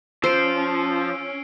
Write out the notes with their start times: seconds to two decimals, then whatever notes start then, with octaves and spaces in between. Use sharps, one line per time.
0.24 F3 C#4 C5 E6 C7 D7